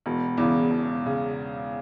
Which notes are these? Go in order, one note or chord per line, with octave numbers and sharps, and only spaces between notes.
E1
E2 C#3
E1
C#3